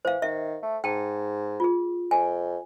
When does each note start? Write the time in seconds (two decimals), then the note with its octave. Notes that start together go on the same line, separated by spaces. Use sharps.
0.05 E3 C5 F5
0.22 D#3 E5
0.62 A3
0.84 G#2 G5 A5
1.60 F4 G#4
2.11 F2 G#5